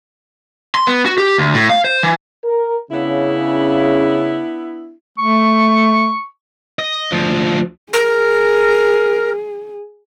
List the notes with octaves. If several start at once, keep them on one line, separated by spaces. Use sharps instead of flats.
C6
B3
F#4
G4
D2
A2
F5
C5
E3
A#4
C#3 B3 D4 E4
A3 C#6
D#5
D2 F3
G#4 A#4